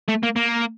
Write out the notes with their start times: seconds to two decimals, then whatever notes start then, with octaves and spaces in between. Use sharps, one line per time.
0.09 A3
0.23 A#3
0.36 A#3